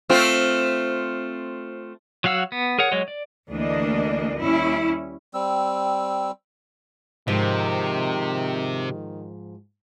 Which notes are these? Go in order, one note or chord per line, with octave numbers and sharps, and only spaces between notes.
A3 C4 F4
F#3 F#4 F5 F#5 E6
B3
G#4 A#4 C#5 F#5
F#3 G#3 C#5 D#5
D5
D2 E3 A#3 D4 D#5
D#2 G3 C#4 E4
G3 C4 E6
G#2 C3 D#3 F3 D#5